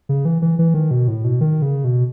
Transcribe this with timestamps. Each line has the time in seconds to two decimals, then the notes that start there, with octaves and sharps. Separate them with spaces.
0.09 C#3
0.25 E3
0.42 E3
0.59 E3
0.74 D#3
0.91 B2
1.08 A2
1.24 B2
1.41 D#3
1.62 C#3
1.84 B2